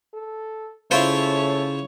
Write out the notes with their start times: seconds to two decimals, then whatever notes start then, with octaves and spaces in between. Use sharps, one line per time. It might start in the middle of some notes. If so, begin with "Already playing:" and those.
0.14 A4
0.91 C#3 A3 E4 F4 C5 C#5